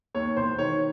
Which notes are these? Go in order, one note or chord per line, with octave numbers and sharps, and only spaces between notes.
D#2 C#5
E1 C5
D#3 C#5